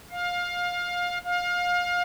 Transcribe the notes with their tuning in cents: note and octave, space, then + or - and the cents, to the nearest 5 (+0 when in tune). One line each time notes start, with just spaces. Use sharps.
F5 +20
F5 +25